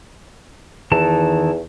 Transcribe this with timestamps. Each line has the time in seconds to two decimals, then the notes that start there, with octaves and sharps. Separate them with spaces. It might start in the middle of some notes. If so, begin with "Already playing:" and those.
0.92 E2 D#3 E3 A5